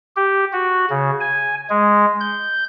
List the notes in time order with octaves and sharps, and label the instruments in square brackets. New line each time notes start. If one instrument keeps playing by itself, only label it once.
[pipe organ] G4
F#4
C#3
G#5
G#3
G6